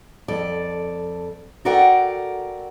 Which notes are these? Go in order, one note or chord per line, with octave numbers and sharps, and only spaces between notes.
F2 A4 D5
F#4 A4 A#4 D5 F#5 G5